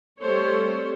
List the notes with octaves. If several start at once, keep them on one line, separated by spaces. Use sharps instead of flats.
G3 A3 C4 A4 C5 C#5